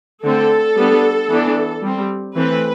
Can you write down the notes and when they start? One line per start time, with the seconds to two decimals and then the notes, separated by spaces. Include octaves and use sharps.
0.24 D3 A3 C4 A4
0.76 G3 B3 D4
1.29 E3 B3 D4
1.83 G3 C4
2.36 E3 A3 C4 B4